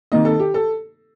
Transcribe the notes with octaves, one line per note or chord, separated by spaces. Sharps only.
C3 D#3 A#3 D#4 D#5
A4
G4
A4